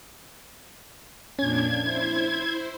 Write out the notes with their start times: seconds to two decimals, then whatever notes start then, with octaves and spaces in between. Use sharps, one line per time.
1.39 F2 A#2 C#4 D4 G#6
1.83 E4 C5